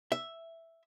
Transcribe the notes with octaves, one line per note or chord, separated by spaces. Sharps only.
E5